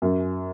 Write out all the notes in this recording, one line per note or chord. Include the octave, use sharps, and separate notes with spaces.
F#2